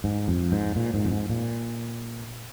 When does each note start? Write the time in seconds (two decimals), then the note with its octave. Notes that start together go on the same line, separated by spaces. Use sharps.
0.04 G#2
0.28 F2
0.52 G#2
0.76 A#2
0.94 G#2
1.05 F2
1.12 G#2
1.29 A#2